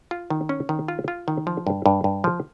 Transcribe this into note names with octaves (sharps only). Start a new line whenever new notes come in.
F4
D#3
C#4
D#3
F4
F4
D#3
F3
G2
G2
G2
F3